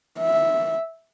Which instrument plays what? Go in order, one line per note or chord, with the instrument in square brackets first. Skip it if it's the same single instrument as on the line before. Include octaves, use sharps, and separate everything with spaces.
[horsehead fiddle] E5